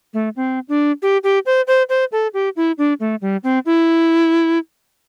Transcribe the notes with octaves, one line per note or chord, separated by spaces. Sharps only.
A3
C4
D4
G4
G4
C5
C5
C5
A4
G4
E4
D4
A3
G3
C4
E4